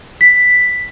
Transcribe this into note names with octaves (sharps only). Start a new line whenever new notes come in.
B6